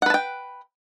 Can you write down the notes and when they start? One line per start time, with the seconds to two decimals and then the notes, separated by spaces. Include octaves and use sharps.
0.02 F#5
0.06 B4
0.10 A5
0.14 G5